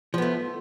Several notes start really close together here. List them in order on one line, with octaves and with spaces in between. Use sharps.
F3 B3 A3